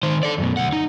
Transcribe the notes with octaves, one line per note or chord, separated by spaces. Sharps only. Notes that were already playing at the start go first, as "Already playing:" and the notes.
D#3 C5
A4 D5
F#2 B2
D2 F#5
D#4